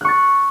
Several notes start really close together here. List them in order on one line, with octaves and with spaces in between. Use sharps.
F#6 C#6 A6